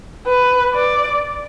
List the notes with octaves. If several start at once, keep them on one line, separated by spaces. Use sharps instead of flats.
B4
D5